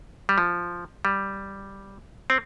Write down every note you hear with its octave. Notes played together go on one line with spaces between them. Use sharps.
G3
F3
G3
C4